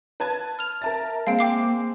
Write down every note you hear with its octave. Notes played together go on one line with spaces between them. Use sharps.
B4 A5 G#6
F6 F7
A#4 E5 A5 A6
G#3 A#3 C4 F5 D7
G5 D6 C7